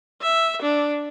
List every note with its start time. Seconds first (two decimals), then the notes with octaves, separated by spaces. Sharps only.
0.22 E5
0.62 D4